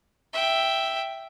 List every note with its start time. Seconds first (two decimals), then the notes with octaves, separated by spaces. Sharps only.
0.33 E5 G5